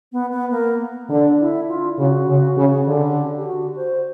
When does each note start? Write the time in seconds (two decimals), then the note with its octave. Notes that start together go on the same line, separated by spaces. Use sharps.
0.12 B3
0.32 B3
0.51 A#3
1.09 D3 D4
1.40 E4
1.69 F4
1.98 C#3 F#4
2.28 C#3
2.57 C#3
2.87 D3 G4
3.37 G4
3.47 F#4
3.76 C5